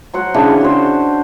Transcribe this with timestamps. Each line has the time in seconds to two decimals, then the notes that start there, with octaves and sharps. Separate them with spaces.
0.14 F#3 C5 F#5
0.34 C#3 E3 D4
0.61 F#4 C5